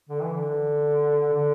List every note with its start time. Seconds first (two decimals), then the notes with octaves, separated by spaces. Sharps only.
0.09 D3
0.22 E3
0.34 D3
1.33 D3